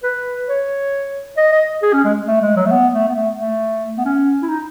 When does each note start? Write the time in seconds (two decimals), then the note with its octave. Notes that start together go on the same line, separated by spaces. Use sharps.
0.03 B4
0.48 C#5
1.37 D#5
1.52 D#5
1.82 G#4
1.93 C#4
2.04 G#3
2.27 A3
2.42 G#3
2.56 F#3
2.66 A3
2.71 B3
2.93 A3
3.08 B3
3.15 A3
3.38 A3
3.97 B3
4.05 C#4
4.42 E4
4.49 D#4